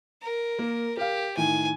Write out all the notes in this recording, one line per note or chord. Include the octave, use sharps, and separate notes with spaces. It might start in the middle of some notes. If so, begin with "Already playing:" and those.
A#4
A#3
G4 A#4 F5
A2 D#3 G#5